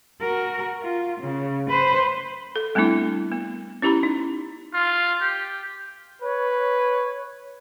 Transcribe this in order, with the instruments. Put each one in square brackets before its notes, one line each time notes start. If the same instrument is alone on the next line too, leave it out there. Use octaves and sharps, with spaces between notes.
[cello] F#4 A#4
F4
C#3
B4 C5
[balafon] A4
G3 A3 B3 C4 D4 E4
B3
C#4 E4 G4 A#5 B5
D#4
[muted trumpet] F4
G4
[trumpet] B4 [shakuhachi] C#5